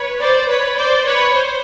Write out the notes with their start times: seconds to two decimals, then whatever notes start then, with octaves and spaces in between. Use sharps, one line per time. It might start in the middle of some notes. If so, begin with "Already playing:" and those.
Already playing: B4 C#5
0.20 C5 D5
0.48 B4 C#5
0.77 C5 D5
1.05 B4 C#5
1.34 C5